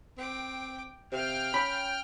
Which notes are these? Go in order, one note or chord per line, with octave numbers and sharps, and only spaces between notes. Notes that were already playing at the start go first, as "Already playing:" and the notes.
C4 G5 D6
C3 F5 G5 F6
C#4 B5